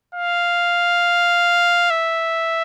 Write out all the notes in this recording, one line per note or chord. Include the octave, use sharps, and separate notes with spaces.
F5
E5